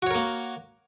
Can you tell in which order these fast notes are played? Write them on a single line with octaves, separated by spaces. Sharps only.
F#4 C#5 A#4 A#3